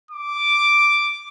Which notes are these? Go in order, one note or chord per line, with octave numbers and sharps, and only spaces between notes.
D6